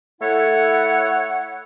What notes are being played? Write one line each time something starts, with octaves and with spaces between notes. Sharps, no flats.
A3 E4 A4 C#5 F#5